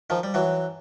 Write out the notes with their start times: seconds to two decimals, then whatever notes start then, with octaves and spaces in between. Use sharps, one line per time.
0.10 D#3 F3
0.23 G3
0.34 E3 F#3